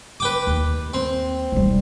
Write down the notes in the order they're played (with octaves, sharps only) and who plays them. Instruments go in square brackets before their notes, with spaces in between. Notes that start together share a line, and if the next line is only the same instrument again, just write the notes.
[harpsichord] B4 G5 D6
[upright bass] D#2
[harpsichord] C4
[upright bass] E1 G3